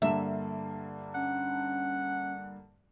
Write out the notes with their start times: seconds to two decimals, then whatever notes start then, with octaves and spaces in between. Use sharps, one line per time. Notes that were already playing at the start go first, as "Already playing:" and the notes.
0.02 G2 D3 A#3 E5
1.14 C#4 F#5